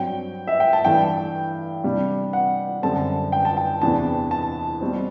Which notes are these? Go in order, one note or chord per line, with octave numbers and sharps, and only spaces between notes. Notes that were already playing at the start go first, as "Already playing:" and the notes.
Already playing: G2 F#3 C4 G5
E5
G5
A5
G2 E3 A3 G5
C3 G3 D4
F#5
F#2 D3 G3 C4 A5
G5
A5
G5
E2 C3 E3 B3 D4 A5
A5
B2 G3 C4